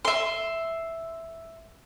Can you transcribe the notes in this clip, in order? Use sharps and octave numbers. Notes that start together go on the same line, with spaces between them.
E5 C6